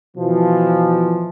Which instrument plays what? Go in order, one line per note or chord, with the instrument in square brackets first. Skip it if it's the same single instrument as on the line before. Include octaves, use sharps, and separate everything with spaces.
[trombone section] B2 E3 F3